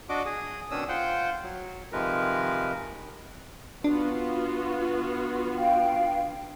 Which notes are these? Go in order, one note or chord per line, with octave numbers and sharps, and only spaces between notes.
D4 F#4 D#5 D6
G#4 D#6
B2 D#3 C#4 D4 D#6 E6
F4 C5 F#5 G5
F#3
C3 D#3 F3 G#3 A#4 B4
B3 D4 F4 F#4
F5 G5